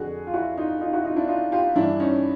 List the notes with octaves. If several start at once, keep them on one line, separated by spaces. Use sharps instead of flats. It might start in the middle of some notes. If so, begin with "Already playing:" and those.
Already playing: F2 D3 F#4 G#4
F4
E4 F#4
D#4 F4
D#4 F4
E4 F#4
D#4 F4
D4 E4
D#4 F4
F4 G4
G2 E3 D4 E4
C#4 D#4